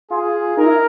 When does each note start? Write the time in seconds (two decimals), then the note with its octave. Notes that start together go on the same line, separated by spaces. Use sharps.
0.10 F4 G#4
0.57 D#4 A#4
0.66 E4